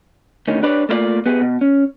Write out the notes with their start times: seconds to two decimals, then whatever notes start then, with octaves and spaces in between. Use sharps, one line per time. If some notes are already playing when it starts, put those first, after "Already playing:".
0.48 D2 A2 D#3 C#4
0.63 D4 G4 B4 C#5 D5
0.89 A3 A#3 E4 F4 D5
1.26 B3 G4 G#4
1.41 B2
1.61 C#4